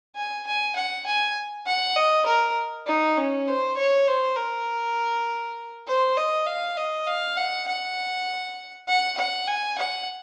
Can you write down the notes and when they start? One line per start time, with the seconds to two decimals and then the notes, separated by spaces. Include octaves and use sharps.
0.16 G#5
0.47 G#5
0.76 F#5
1.06 G#5
1.66 F#5
1.96 D#5
2.26 A#4
2.87 D#4
3.17 C#4
3.47 C5
3.77 C#5
4.07 C5
4.36 A#4
5.87 C5
6.17 D#5
6.47 F5
6.77 D#5
7.07 F5
7.37 F#5
7.67 F#5
8.88 F#5
9.18 F#5
9.47 G#5
9.78 F#5